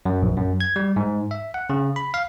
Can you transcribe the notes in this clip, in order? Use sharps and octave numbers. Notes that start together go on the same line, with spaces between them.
F#2
A#1
F#2
G#6
G3
G#2
E5
F#5
C#3
B5
F5